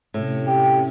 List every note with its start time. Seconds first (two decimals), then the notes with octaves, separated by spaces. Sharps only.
0.14 A2 C3 C#4
0.47 G4